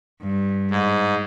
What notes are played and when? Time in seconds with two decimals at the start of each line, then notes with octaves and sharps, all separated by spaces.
0.22 G2
0.71 G#2